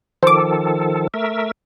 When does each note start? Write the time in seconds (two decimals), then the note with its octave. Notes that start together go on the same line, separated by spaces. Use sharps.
0.23 D#3 F3 A4 C5 D6
1.14 A3 A#4 E5